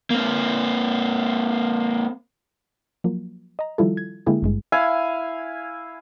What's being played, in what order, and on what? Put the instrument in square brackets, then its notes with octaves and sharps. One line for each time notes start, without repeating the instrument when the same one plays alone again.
[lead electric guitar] A#3 C4
[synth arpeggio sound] F3 F#3 A#3
D#5 A#5
D#3 F3 G3 E4 F4 A4
G#6
D3 G#3 A#3 E4 G4 G#4
G#1 G2 G#3
[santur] E4 F5 G#5